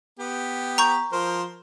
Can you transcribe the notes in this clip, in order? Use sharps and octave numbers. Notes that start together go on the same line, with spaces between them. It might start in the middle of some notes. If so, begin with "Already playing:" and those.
B3 G4
A#5 C#6 G6
F3 A#4 C5